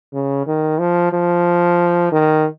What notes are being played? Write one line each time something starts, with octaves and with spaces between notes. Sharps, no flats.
C#3
D#3
F3
F3
D#3